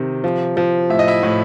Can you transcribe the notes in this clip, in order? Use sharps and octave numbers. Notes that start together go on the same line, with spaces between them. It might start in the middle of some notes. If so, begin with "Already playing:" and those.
Already playing: C3 D#3
F3
F3
A2 E5
D#5
E4 E5
A2